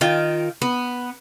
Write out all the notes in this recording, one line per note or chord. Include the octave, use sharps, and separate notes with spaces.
D#3 F4 G5
B3